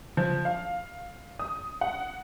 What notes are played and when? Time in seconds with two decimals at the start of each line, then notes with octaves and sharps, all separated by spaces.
0.17 F3
0.45 F5
1.39 D#6
1.81 F#5